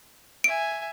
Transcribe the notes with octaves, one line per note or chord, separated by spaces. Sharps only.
E5 G#5 D7